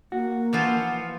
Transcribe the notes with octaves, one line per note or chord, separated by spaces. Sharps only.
A#3 F#4
E3 F3 F4 F#5